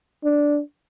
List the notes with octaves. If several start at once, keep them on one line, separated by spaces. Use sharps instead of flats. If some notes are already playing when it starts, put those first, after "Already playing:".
D4